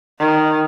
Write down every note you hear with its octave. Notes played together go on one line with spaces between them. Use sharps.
D#3